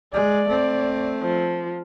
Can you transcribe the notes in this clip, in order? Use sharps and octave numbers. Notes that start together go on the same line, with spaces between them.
G#3 D5
A3 C4
F3